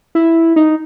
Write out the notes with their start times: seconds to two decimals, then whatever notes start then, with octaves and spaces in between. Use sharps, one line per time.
0.15 E4
0.56 D#4